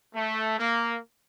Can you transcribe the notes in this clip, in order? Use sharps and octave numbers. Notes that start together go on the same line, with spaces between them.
A3
A#3